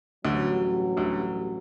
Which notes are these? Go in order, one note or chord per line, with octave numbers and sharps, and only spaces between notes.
A1 D2 G2 D3 F#3
D2 D3